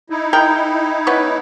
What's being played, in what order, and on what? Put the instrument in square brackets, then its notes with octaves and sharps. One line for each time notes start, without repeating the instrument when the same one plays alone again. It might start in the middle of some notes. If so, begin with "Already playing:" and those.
[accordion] D#4 E4
[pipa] G#4 A#4 G5
B3 C#4 B4